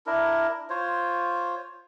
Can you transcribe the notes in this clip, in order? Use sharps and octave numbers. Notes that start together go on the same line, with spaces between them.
D4 E4 A#4
F4 C5 C#5